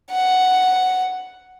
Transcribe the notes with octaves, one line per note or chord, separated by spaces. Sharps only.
F#5